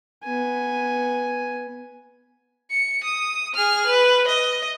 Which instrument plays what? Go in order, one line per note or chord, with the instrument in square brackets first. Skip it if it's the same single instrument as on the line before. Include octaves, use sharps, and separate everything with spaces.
[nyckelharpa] B3 G#5
[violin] C#7
D#6
G#4 F6
B4
D#5